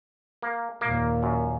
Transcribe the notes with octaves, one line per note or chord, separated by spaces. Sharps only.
A#3
D#2 A#2 A#3
F#2